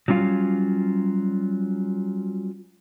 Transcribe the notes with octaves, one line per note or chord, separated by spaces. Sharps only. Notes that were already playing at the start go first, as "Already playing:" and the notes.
F#3 G3 C#4 F4 F5